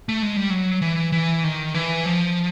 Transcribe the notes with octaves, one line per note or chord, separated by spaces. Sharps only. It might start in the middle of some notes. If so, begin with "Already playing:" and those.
A3
G#3
G3
F#3
E3
E3
D#3
E3
F3